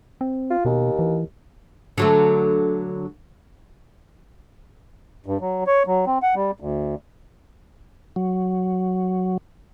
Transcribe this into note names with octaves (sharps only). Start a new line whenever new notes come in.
C4
F4
D#2 B2
E3
D3 F#3 A3
G2
F#3
C#5
F#3
C4
F#5
G3
D2
F#3